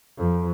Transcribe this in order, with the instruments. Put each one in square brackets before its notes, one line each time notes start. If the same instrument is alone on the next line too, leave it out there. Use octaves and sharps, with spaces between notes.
[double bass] F2